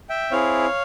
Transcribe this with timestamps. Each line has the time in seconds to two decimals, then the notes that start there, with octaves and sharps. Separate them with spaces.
0.10 E5 G5
0.31 C4 E4 G#4 C#5 F5